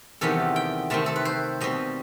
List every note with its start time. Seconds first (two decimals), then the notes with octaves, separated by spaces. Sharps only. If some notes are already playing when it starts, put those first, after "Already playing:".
0.21 E2 C3 D#3 G3 B3 A4
0.56 G5
0.90 C3 D#3 A3 C4 A5
1.06 A4
1.16 B4
1.25 C5
1.61 B2 G3 C4 D#5